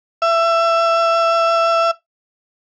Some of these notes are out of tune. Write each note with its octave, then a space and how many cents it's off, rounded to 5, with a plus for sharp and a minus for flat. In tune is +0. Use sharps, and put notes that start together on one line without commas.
E5 +20